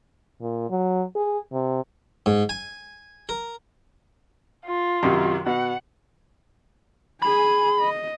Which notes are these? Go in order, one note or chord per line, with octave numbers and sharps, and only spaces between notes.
A#2
F#3
G#4
C3
G#2
G#5
A#4
F4
F#2 C3 D#3
B2 F#5
G#4 G#5 B5
D#5